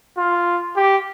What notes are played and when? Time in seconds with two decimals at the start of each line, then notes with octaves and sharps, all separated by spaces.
0.17 F4
0.76 G4